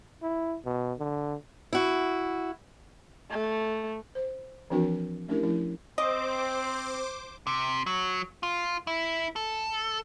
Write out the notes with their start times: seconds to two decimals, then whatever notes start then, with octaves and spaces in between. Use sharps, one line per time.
0.22 E4
0.65 B2
0.99 D3
1.73 E4 F#4
3.31 A3
4.15 C5
4.70 E3 F3 C4 D4 F#4 A#4
5.29 A3 C#4 D4 E4 G4 A#4
5.43 F3 A3 C#4 E4
5.98 C4 C5 D#5 D6
7.47 C3
7.86 F#3
8.43 F4
8.87 E4
9.36 A4